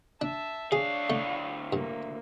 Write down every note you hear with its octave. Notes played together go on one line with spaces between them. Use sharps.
D4 E5 A5
D2 D4 G#4 C#5 F5
A3
G2 A#3